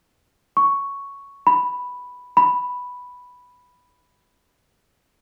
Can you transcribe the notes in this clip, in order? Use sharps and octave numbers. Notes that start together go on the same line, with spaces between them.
C#6
B5
B5